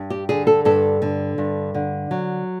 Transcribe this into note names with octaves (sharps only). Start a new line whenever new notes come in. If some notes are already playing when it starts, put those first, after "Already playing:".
Already playing: G2
G4
D3 G#4
A4
G2 A4
D3
G2
D3
F#3